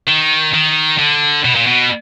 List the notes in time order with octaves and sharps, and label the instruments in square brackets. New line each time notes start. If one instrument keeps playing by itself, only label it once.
[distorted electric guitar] D#3
D#3
D3
B2
A#2
B2